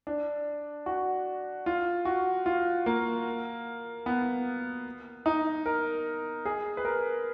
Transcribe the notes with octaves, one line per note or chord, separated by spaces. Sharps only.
D4
F#4
F4
F#4
F4
A#3
B3
D#4
A#4
G#4
B4
A#4